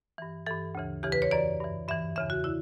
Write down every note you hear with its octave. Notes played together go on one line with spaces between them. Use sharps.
G2 E3
G2 E3 A4
D2 C#3 E3
E2 C#3 E3 G4
B4
C#5
F#2 E3 D5
G2 E3
G2 E3 E5
E2 C#3 E3 E5
F#4
D3 E4